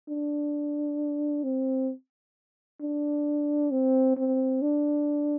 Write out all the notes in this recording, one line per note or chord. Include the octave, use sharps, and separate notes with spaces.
D4
C4
D4
C4
C4
D4